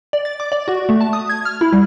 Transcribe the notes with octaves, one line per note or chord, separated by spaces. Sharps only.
D5
A6
D6
D5
F#4
A3
A5
D#6
G#6
F6
E4
G3